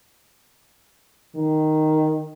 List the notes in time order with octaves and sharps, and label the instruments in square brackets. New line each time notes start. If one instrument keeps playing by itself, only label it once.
[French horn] D#3